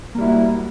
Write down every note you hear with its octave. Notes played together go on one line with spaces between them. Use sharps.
G3 A#3 E4 F#4